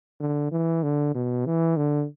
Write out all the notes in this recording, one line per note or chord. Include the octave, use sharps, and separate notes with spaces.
D3
E3
D3
B2
E3
D3